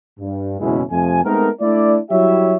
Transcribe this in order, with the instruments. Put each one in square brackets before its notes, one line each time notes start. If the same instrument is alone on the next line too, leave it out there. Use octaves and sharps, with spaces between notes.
[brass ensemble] G2
F#1 E2 B2 G#3 C#4 E4
F2 C3 F3 A3 G#5
G#3 A3 B3 C4 D#4 A#4
A3 D4 E4 D5
F#3 G3 E4 G4 C#5 E5